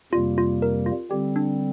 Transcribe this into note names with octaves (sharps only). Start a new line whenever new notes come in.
F2 C3 G3 A#3 F4
F4
A#4
F4
D3 G3 C4 G4
D4